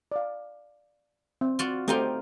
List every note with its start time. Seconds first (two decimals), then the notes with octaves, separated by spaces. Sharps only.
0.12 D5 F5
1.41 C4
1.59 F4 F#4 D5
1.88 A3 C4 D#4 F4 G4 G5